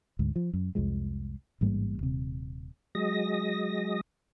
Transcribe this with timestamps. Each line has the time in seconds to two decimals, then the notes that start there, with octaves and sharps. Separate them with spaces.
0.19 D2 G#2
0.36 F3
0.53 F#2
0.75 C2 F2 F3 G#3
1.61 A1 G#2 G3 A#3
1.99 D#1 C3
2.95 F#3 G#3 D#5 A#6